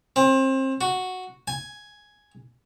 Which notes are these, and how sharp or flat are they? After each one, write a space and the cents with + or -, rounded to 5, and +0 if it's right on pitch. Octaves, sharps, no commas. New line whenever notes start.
C4 +30
F#4 -5
G#5 +5